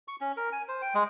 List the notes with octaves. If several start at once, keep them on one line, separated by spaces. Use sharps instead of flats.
C#6
C#4
A#4
G#5
C5
G5
G#3